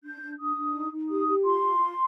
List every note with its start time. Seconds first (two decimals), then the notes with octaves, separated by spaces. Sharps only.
0.04 D4 G6
0.22 D4
0.39 D4 D#6
0.57 D4
0.74 D#4
0.92 D#4
1.10 G4 D#6
1.27 G4
1.44 F4 C6
1.62 F4
1.79 F4